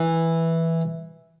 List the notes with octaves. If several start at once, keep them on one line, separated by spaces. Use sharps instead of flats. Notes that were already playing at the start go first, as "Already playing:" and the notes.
Already playing: E3